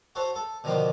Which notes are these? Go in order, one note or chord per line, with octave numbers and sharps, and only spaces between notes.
F#4 A4 C5 C#5
A4
B2 D3 D#3 F3 A#3 B3